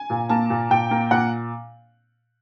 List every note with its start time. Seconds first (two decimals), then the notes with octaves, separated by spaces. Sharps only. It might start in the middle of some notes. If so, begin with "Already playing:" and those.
Already playing: G#5
0.10 A#2
0.29 A#3 A5
0.50 A#2
0.70 A#2 G5
0.91 A#3
1.11 A#2 F#5